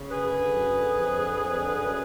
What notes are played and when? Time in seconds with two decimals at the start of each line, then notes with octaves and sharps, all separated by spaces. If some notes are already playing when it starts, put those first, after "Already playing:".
Already playing: C#3
0.10 F#2 G#4 B4
0.31 D3
0.51 F#2
0.71 D3
0.92 F2
1.12 D3
1.32 F2
1.53 D3
1.73 F#2